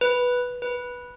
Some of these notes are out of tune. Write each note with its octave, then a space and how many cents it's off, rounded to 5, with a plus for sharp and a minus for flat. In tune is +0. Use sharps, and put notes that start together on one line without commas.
B4 -5
B4 -10